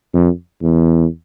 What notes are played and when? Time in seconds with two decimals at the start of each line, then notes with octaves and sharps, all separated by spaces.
0.14 F2
0.62 E2